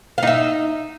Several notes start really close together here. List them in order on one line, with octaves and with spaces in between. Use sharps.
F5 D#4 E5